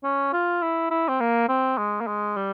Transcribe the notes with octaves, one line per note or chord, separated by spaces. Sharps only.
C#4
F4
E4
E4
C4
A#3
C4
G#3
A#3
G#3
G3